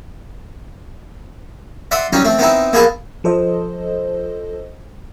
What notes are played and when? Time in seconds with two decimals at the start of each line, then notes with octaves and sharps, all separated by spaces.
1.91 D5 E5 F#5 C6 D#6
2.13 F#3 G3 C#4 D#4
2.25 A3 C4
2.39 B3 C4 D#4 E4
2.73 A#3 B3 G#4 A4 B4
3.24 F3 A4 C5 D#5